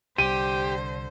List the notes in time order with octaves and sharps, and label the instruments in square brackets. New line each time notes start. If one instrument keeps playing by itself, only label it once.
[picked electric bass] C2 G3 [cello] D3 C5 [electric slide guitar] G4 [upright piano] D#7